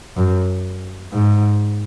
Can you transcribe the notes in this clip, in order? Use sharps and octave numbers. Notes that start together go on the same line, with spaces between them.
F#2
G#2